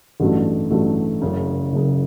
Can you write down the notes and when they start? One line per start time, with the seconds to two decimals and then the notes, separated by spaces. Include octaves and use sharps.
0.20 A1 G2 F#3 A3
0.70 A1 G2 F#3 A3
1.22 F#1 F#2 C#3
1.73 F#1 F#2 C#3